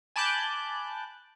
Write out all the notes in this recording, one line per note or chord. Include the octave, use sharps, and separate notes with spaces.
G#5 A5 B5 D6 F#6 G6